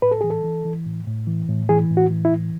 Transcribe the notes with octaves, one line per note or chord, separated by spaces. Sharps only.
A2 B4
A4
E3 G#4
A4
E3
E3
A2
A2
E3
A2
E3 G#4
A2
F#4
E3
E4
A2